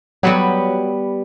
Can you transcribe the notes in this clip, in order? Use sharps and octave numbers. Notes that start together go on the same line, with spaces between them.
F#3 G3 B3 G4